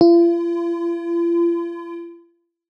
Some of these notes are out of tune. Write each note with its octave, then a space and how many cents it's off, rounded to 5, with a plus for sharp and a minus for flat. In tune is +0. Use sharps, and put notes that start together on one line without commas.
F4 -45